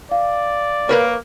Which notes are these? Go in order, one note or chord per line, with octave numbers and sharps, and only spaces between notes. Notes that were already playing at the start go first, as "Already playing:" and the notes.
D5 F5
A#3 A#4 B4 C#5